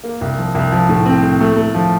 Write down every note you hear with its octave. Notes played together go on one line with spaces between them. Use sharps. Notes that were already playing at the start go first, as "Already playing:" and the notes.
A#3
C2
F3
C2
F3
A2
C4
A2
A3
A3
F3